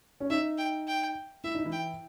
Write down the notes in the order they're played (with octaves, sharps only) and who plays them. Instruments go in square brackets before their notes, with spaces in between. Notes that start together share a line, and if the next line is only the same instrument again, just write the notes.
[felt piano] C#4
[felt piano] D#4 [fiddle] E5
[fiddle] G5
G5
[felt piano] E4 [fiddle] E5
[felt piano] D#4
E3 E4
[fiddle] G5